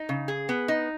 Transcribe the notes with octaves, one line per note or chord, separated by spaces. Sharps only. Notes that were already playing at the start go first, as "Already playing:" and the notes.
Already playing: D#4
C#3
G#4
B3
D#4